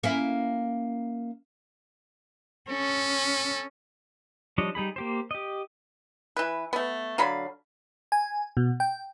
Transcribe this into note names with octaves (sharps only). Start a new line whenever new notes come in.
A#3 C#4 E4
C#4 A4
F3 G3 D4 C#5 D#5
G3 D#4 G#4 B5
A#3 G4 C5
G4 D#5
E3 B4
A3 B3
D3 F#3 F5 B5
G#5
B2
G5